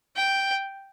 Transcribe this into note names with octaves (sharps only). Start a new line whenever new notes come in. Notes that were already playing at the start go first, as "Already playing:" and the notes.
G5